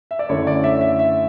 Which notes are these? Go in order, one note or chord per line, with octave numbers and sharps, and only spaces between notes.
E5
D5
F#2 D3 A3 C#4 E4 C#5
D5
E5
E5
E5